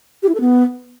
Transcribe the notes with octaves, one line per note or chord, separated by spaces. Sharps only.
G4
E4
A4
B3